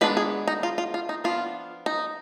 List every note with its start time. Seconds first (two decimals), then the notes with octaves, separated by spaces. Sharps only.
0.01 D#3 G#3 B3 D4 B4
0.17 G#4
0.48 D#4
0.63 F4
0.78 F4
0.94 F4
1.09 D#4
1.24 F3 B3 D4 F4
1.86 D#4